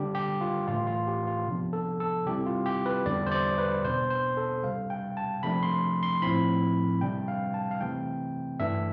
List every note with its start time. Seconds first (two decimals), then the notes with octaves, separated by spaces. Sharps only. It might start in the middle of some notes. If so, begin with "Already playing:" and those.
Already playing: D3 G3 D4 G4
0.15 G4
0.41 F4
0.68 A2 E3 A3 F4
0.87 F4
1.07 G4
1.27 F4
1.47 C3 F3 B3 D4
1.73 A4
2.00 A4
2.26 C3 G3 C4 E4 G4
2.46 F4
2.66 G4
2.86 B4
3.06 E2 D3 G3 D4 D5
3.26 C5
3.32 D5
3.58 B4
3.84 B2 B3 D4 C5
4.10 C5
4.37 A4
4.64 C3 G3 D4 F5
4.90 G5
5.17 A5
5.43 C3 F3 A3 D4 B5
5.63 C6
6.03 C6
6.22 A2 F3 C4 E4 B5
7.01 C3 G3 D4 G5
7.28 F5
7.54 A5
7.71 F5
7.80 C3 E3 A3 C4 G5
8.60 G2 E3 A3 D4 E5